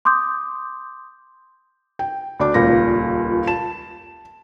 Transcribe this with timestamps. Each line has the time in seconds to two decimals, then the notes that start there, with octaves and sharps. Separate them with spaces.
0.05 C6 D6 D#6 G6
1.99 G5
2.39 D2 D4 D6
2.54 D#1 C#2 A#2 A#6
3.47 A5 E7